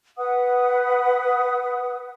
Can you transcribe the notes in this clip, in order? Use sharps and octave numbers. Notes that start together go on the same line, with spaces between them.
B4 F#5 D#6